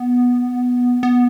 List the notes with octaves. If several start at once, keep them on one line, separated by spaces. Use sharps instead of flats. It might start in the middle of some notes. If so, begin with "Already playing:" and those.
Already playing: B3
B3